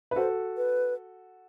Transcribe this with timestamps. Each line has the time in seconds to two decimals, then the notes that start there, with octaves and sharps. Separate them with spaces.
0.11 B4
0.16 F#4 A4 C5
0.57 B4